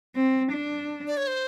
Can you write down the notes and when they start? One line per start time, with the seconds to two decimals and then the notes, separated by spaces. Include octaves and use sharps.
0.16 C4
0.52 D4
1.07 D5
1.17 C#5
1.27 C5